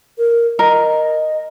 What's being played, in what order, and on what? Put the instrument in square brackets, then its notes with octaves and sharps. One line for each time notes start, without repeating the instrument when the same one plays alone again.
[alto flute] A#4
[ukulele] A#4 [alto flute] D#5